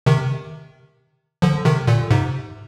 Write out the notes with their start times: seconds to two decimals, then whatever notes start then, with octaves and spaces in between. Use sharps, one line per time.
0.06 C3 D#3
1.42 D3 F3
1.65 C3 D#3
1.88 A#2 D3
2.10 G#2 C3